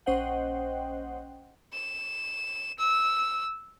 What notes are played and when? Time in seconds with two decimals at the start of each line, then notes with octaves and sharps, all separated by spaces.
0.06 A#1 C#4 C5 D#5 F#5 G5
1.73 E7
2.79 E6